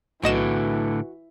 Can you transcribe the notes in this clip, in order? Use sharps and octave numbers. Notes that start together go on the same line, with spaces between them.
B1 A2 D3 E3 F#4 D#5 E7